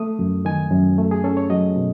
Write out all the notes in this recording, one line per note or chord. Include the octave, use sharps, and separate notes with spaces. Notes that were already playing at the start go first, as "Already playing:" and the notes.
Already playing: A3 D#6
F#2
D#3 G#5
F#2
A3
G#4
C#4 A4
C#5
F#3 D#5
B2